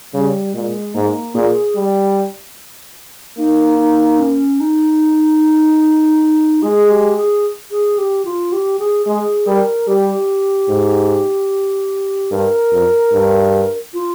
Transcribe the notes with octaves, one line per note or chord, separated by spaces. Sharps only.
C#3 G3
A#2 G#3
G#2 A#3
A#2 G#4
G3
A#3 D#4
D#4
C#4
D#4
G#3 G#4
G4
G#4
G#4
G4
F4
G4
G#4
G#3 G#4
G3 A#4
G3 G4
G#2
G2 A#4
F2
G2
F4